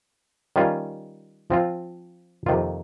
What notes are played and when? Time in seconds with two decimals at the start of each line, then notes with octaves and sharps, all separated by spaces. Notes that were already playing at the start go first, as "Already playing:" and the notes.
0.56 D#3 G3 C#4 F4
1.50 F3 C4 F4
2.46 F2 C3 D#3 A#3 F4